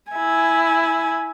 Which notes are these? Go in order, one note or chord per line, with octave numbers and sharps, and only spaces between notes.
E4 G#5